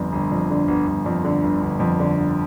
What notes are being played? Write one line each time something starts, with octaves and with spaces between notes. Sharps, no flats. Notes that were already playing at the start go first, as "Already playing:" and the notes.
Already playing: G1 F2 D3
G1
F2
D3
G1
G1
F2
D3
G1
G1
F2
D3
G1